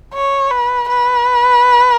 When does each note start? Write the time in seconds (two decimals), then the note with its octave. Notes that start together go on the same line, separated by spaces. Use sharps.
0.14 C#5
0.51 B4
0.89 B4